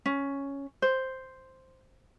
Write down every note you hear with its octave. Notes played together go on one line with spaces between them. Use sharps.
C#4
C5